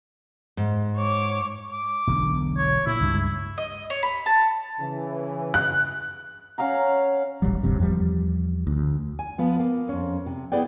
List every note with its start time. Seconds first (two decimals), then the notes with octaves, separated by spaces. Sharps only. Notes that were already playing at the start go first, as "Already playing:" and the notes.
0.57 G#2
0.97 C#5 D6
1.72 D6
2.07 E1 B1 D3
2.57 C#5
2.87 A#2 E4
3.01 C#2 G2 G#3
3.58 D#5
3.90 C#5
4.03 B5
4.26 A5
4.80 C#3 E3
5.54 F#6
6.58 C#4 F5 F#5 A#5
7.42 D#1 A1 F#3 G3
7.63 E1 D2 G2 C3
7.80 E2 F3 G3
8.67 D2
9.19 G#5
9.38 F3 B3
9.59 A#3
9.89 F2 C#4
10.26 C3
10.52 B3 E4 G#4 B4 D5 G5